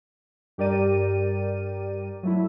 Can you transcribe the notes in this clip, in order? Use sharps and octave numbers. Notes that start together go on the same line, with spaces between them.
G2 G4 A#4 D5 D#7
F#3 A3 E4